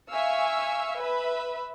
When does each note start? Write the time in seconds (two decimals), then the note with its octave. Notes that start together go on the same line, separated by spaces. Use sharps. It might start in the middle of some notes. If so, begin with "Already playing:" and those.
0.11 E5 F5 G#5 C#6 E6
1.01 B4 E5 B5